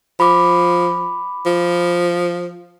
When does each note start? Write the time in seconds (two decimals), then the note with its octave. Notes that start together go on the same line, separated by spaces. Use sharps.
0.20 F3 B5 D6
1.46 F3